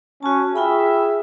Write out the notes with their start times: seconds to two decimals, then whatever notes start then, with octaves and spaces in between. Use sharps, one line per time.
0.23 C#4 F#4 A5
0.56 F4 G#4 E5 G5 B5